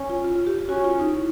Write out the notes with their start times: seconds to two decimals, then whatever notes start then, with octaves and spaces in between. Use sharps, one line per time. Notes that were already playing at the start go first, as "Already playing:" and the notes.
Already playing: C#4
0.10 F4
0.24 F4
0.36 F4
0.47 G4
0.59 G4
0.69 C#4 F#4
0.85 F4
1.00 D#4
1.14 E4